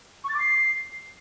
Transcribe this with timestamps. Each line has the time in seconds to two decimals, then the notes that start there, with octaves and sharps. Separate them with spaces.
0.24 C#6
0.29 A6
0.34 D6
0.39 C7